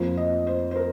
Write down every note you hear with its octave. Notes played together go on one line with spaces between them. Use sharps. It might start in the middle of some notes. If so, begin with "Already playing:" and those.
Already playing: F2 F3 A#3
D#5
C5
C5
A#4